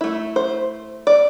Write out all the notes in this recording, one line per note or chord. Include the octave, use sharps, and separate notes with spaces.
A3 E4
C5
D5